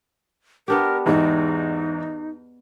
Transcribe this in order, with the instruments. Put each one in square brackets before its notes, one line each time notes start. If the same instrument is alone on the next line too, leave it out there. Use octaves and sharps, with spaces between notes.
[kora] B3 D4 G4 [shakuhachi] A#4
[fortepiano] E2 G#2 [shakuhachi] D#4